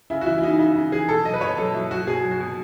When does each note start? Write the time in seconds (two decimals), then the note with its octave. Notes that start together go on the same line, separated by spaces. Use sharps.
0.10 C#3 E4
0.21 F#4
0.26 E3 E4
0.38 E4
0.43 C#3 D#4
0.59 C#3 E4
0.75 C#3
0.92 E3 G#4
1.08 B2 A4
1.25 F#3 D#5
1.33 B4
1.41 B2 C#5
1.58 F#3 A4
1.74 F#3 E4
1.91 F#3 F#4
2.07 B2 G#4
2.24 F#3
2.31 F#4
2.40 B2